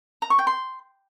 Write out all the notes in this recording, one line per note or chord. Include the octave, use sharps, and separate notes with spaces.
A#5
C#6
G5
C6